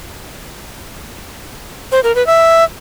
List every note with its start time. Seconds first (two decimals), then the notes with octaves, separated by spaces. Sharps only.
1.92 C5
2.03 A#4
2.15 B4
2.27 E5